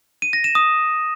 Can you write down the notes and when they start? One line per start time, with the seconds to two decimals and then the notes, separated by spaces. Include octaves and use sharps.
0.22 D#7
0.33 A#6
0.44 E7
0.55 D#6